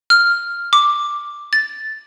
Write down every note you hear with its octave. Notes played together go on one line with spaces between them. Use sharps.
F6
D6
A6